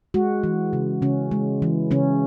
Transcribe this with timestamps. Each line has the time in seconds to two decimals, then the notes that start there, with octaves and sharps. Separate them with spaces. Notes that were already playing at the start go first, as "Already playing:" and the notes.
0.14 G#3 F#4
0.44 E3
0.73 C#3
1.02 C#3 C#4
1.31 G#3
1.62 E3
1.91 C#3 C#4